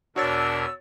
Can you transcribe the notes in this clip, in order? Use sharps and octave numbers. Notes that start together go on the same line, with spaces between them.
E2 B2 D4 F#4 A#4 C#5 E6 A6